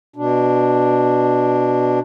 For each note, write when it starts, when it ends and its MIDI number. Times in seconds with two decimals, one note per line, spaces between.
0.16 1.99 47
0.16 1.99 62